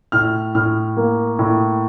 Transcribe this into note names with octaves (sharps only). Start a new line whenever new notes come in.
A2 F6
A2 F6
A#3
A2